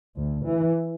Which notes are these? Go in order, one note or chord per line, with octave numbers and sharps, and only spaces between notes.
D2
E3